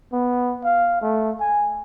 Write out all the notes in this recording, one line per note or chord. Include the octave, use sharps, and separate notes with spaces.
B3
F5
A3
G#5